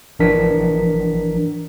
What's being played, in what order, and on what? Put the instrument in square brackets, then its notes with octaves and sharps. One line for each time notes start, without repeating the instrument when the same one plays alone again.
[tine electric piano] G#1 E3 F3 D4 A#4 B6